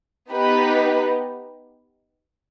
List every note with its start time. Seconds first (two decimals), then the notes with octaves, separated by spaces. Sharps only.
0.32 B3 D#4 G4 B4